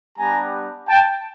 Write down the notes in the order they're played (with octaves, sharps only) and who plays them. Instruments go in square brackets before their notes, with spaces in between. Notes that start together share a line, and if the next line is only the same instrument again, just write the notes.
[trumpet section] G3 B3 D4 G4 G#5 A#5
G5 A5